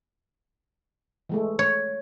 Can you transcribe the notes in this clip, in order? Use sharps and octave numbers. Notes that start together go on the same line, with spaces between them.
E3 G#3 A3
C#5